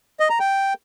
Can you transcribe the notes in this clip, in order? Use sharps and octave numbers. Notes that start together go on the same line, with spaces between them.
D#5
A#5
G5